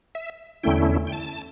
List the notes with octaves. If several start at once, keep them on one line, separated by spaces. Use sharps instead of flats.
E5
E2 D3 A3 C#4 E4 G5
G5
A5